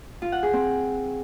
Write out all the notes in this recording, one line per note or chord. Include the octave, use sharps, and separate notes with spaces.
F4
F#5
G#4
C4